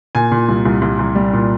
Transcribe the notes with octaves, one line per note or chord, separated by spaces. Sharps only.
A#2 G#5
A#2
C2
C2
C2
C2
G3
A#2